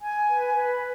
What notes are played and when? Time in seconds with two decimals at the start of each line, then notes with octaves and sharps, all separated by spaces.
0.02 G#5
0.29 B4
0.54 B4